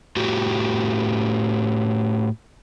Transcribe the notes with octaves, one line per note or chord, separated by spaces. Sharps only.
A2 F#4 G4